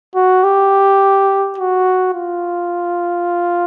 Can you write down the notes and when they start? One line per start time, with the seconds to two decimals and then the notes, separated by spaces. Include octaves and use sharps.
0.15 F#4
0.44 G4
1.58 F#4
2.14 F4